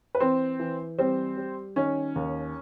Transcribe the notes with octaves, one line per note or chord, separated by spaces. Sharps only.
B4
E3 C4 C5
E3
G3 C4 C5
G3
D#3 C#4 C#5
D#2